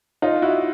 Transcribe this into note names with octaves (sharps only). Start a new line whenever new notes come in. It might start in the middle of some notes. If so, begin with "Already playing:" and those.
D#4 F4
E4 F#4